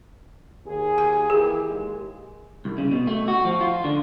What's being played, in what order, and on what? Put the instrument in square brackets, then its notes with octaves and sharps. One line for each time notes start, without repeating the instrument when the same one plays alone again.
[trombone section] D#2 G#4
[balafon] G#5
[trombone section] E3 A#3 G4 [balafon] G#4
[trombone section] D#2 G#3
[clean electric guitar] C2
C#3
B2
A3
F#4
F3
F4
D3